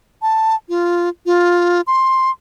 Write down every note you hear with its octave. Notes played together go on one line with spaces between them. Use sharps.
A5
F4
F4
C6